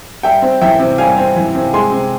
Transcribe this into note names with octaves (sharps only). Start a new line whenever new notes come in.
G3 E5 G5
C4
E3 E5 G5
C3
G3 F5 G#5
C4
E3
C3
G#3 G#5 C6
C3